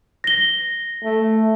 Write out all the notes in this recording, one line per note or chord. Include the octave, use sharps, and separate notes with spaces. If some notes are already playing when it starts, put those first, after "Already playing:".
A#6 G7
A3